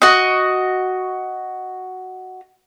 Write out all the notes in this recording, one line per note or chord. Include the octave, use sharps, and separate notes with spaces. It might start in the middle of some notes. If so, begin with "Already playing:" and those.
F#4 D#5